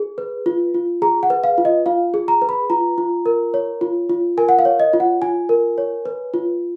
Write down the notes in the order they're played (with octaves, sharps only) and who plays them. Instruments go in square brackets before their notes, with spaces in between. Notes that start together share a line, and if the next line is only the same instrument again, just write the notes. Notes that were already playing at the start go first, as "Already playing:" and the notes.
Already playing: [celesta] G#4
B4
F4
F4
G#4 A#5
F#5
B4
F5
F4
D#5
F4 F5
G#4
A#5
B4
B5
F4 A#5
F4
A#4
C#5
F4
F4
A#4 G#5
F#5
F5
C#5
D#5
F4
F#5
F4 G#5
A#4
C#5
B4
F4